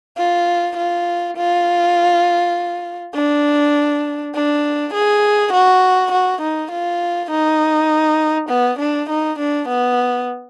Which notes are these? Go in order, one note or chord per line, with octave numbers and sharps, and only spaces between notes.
F4
F4
F4
D4
D4
G#4
F#4
F#4
D#4
F4
D#4
B3
D4
D#4
D4
B3